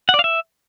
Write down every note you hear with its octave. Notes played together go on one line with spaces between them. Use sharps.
F#5
D5
F5
E5